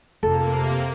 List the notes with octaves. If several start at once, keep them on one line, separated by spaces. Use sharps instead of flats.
F1 C3 A#3 A4